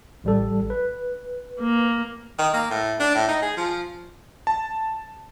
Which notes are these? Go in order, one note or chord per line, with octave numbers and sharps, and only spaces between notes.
A1 G3 A4
B4
A#3
D#3
A#3
A2
D4
A2
D#4
G#4
F3
A5